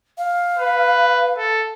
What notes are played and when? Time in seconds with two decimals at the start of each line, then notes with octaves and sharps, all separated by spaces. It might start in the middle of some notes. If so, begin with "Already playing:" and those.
0.18 F5
0.58 B4
1.37 A4